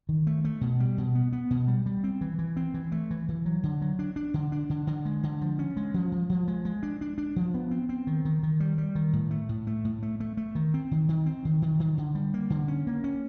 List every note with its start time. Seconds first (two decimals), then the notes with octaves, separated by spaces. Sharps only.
0.09 D#3
0.27 A3
0.45 A3
0.61 B2
0.80 G3
0.98 B2
1.15 B3
1.33 B3
1.51 B2
1.68 G3
1.86 G3
2.04 C4
2.21 E3
2.39 E3
2.57 C4
2.74 E3
2.92 A3
3.11 E3
3.29 E3
3.45 F#3
3.63 D3
3.81 F#3
3.99 D4
4.16 D4
4.34 D3
4.52 D4
4.70 D3
4.87 D3
5.05 G#3
5.23 D3
5.41 F3
5.59 C#4
5.77 G#3
5.94 F3
6.12 F3
6.30 F3
6.48 G#3
6.65 G#3
6.83 D4
7.01 D4
7.18 D4
7.36 F3
7.54 B3
7.71 C4
7.89 C4
8.07 D#3
8.25 D#3
8.43 D#3
8.60 G3
8.78 G3
8.95 D#3
9.13 A2
9.31 A3
9.49 A2
9.67 A3
9.85 A2
10.03 A3
10.20 A3
10.37 A3
10.55 D#3
10.74 C4
10.91 D#3
11.09 D#3
11.26 C4
11.45 D#3
11.62 D#3
11.80 D#3
11.98 D3
12.15 G3
12.34 A#3
12.50 D3
12.68 C#4
12.87 A#3
13.04 C#4